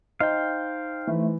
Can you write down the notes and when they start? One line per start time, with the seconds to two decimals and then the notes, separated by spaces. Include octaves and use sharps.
0.20 D#4 C5 D#5 F5 G5
1.07 E3 A3